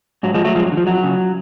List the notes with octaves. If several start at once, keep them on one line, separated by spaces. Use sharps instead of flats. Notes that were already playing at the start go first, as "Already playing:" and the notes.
G#2 F#3
F3 G#3
F#3 A3
F#2 F3 G#3
F#3
D3
F3
F2 F#3
C#3